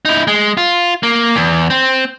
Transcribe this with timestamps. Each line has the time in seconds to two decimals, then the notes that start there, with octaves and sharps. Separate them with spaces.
0.05 D#4 E4
0.27 G#3
0.57 F4
1.03 A#3
1.36 E2
1.70 C4